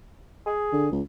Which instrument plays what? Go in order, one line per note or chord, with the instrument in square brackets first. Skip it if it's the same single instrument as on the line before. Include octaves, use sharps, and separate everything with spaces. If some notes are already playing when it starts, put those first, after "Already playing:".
[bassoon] G#4
[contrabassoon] D3
C#2